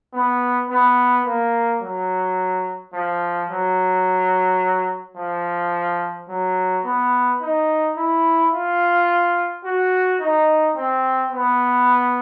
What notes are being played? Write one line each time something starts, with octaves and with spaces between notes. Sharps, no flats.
B3
B3
A#3
F#3
F3
F#3
F3
F#3
B3
D#4
E4
F4
F#4
D#4
C4
B3